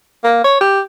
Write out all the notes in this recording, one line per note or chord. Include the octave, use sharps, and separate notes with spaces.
A#3
C#5
G4